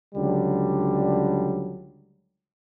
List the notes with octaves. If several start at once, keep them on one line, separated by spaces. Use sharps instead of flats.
C#2 D3 F#3 G3